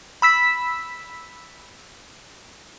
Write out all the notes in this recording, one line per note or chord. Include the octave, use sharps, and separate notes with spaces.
B5 E6 B6